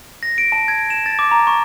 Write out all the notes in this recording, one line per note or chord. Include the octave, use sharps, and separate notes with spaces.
A#6
D7
A5
G#6
E7
A6
D6
A#5
C#6